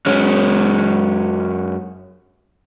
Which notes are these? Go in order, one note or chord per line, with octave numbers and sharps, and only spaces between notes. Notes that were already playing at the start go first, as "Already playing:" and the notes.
F#2 G#3 C#4